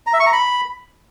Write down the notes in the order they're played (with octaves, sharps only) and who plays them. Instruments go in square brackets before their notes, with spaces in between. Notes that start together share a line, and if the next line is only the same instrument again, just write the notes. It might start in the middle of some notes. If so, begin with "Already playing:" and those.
[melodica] A#5
E5
C#6
A#5
B5